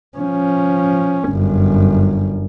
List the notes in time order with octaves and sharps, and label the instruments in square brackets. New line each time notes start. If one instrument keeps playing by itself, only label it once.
[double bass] F3 C#4
G1 F#2